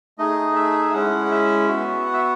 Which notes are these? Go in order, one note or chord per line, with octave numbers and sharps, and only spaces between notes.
A3 D#4 G#4 D#5
E5
G#3 C#4 E4 F#5
F#5
E5
B3 F#4
F#5
E5